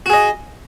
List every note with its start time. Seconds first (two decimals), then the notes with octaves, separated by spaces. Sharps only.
0.06 F#4
0.10 G#4
0.14 D#5